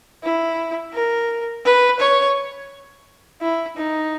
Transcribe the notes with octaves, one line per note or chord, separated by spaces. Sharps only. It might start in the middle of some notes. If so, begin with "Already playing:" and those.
E4
A#4
B4
C#5
E4
D#4